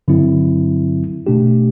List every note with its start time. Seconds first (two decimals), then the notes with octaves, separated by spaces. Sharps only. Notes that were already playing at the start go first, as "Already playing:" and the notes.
0.08 G2 D3 F#3 C4 E4
1.27 B2 A3 D4 G4